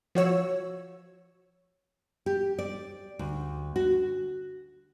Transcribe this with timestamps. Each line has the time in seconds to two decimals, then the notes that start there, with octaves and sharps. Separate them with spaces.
0.15 F3 F#4 C#5 E6
2.26 G4
2.59 D5
3.19 D2
3.76 F#4